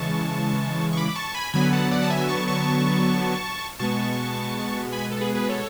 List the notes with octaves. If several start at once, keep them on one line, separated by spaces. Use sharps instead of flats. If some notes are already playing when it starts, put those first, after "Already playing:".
Already playing: C#3 E3 G#3 A5 C#6
C#6
B5 D6
A5 C#6
G#5 B5
D3 F#3 B3 G#5 B5
F#5 A5
D5 F#5
A5
E5 G#5
A5 C#6
A5 C#6
B2 G#3 B3 A5 C#6
G#5 B5
A4
G#4 B4
G#4 B4
A4 C#5